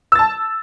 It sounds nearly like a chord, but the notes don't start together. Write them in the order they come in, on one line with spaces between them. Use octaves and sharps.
E6 A6 A5